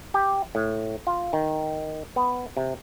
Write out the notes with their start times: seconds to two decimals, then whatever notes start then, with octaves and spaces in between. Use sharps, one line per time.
0.14 G4
0.55 A2
1.07 F4
1.33 D#3
2.16 B3
2.57 C3